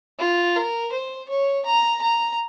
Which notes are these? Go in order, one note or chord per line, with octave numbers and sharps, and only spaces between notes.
F4
A#4
C5
C#5
A#5
A#5